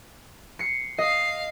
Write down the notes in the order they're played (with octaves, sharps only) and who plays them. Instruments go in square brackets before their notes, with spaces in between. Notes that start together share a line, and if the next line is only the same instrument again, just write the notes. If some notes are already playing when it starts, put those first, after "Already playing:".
[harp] C7 C#7
[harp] D#5 [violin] F5 C7